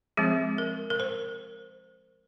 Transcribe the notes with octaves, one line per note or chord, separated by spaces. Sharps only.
F3 G#3 C4 G#4
A#4
A#4
C5